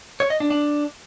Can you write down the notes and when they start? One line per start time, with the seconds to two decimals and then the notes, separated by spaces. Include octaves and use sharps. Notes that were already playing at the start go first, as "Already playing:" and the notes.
0.20 C#5
0.30 D#5
0.40 D4
0.51 D4